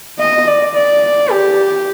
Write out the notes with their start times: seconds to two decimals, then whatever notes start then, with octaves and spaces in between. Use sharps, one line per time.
0.19 D#5
0.47 D5
0.75 D5
1.31 G4